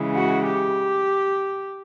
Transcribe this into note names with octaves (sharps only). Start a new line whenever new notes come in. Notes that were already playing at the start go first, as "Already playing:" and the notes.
Already playing: C#3 E3 G#3
F#4
G4